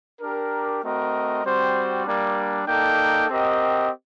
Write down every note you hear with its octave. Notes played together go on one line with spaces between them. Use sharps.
D4 G4 A#4
A3 C4 F#4 A#4 D#5
G3 C4 F#4 C5
G3 A#3 D4
A#3 D#4 A4 D5 G5
C4 G4 A#4 D#5 F#5